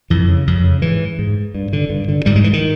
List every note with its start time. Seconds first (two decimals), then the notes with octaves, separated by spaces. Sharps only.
0.10 F2 E3
0.28 C#3
0.47 F2
0.64 C#3
0.82 G#2 E3
1.19 G#2
1.55 G2
1.73 D3
1.90 G2
2.08 D3
2.26 G#2 G3
2.36 G#3
2.44 E3
2.53 D#3